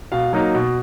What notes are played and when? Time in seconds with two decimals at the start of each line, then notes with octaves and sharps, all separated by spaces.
0.12 B2 F5
0.33 F#3 A#3 D#4
0.54 B2